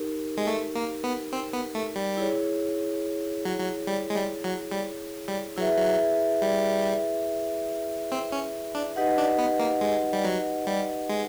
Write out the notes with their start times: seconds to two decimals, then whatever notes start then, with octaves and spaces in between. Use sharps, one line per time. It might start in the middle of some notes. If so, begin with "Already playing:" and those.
Already playing: D#4 G4 A#4
0.37 G#3
0.47 A3
0.75 A#3
1.04 B3
1.33 C4
1.53 B3
1.75 A3
1.96 G3
2.17 E4 G#4 C#5
3.45 F#3
3.59 F#3
3.87 G3
4.10 G#3
4.15 G3
4.44 F#3
4.71 G3
5.28 G3
5.56 F#3 E4 G#4 B4 E5
5.77 F#3
6.42 G3
8.12 C4
8.32 C#4
8.75 D4
8.96 D#4 G4 B4 D#5 F#5
9.18 D4
9.38 B3
9.60 A#3
9.81 G#3
10.13 G3
10.24 F#3
10.67 G3
11.09 G#3